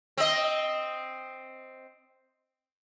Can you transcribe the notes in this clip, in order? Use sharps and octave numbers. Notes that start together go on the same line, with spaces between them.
C4 D#5